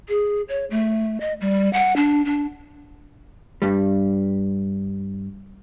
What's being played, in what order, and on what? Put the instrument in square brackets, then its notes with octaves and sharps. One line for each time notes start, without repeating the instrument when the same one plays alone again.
[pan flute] G#4
C#5
A3
D#5
G3
F#5
D4
D4
[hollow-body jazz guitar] G2 G3